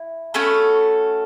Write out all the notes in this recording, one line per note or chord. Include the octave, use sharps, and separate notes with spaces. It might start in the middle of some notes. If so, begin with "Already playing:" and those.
Already playing: E4
A3 C#4 F#4 A4 B5